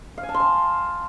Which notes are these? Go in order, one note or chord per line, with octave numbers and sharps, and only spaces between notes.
F5
G#5
A5
C6
A5